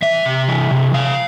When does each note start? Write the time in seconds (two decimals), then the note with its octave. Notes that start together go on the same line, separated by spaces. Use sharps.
0.02 E3 E5
0.25 C3
0.48 E3
0.71 C3
0.94 C3 F5